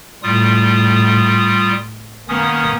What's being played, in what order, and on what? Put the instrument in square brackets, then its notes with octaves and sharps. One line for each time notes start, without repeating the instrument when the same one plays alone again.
[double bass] A2 [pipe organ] G3 F4 D#6
[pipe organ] D#3 C#4 D#6 [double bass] A#3 B3